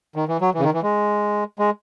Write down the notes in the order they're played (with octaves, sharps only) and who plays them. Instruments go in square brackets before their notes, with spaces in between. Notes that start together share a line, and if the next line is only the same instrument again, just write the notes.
[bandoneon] D#3
E3
F#3
E3
C#3
D#3
E3
G#3
G#3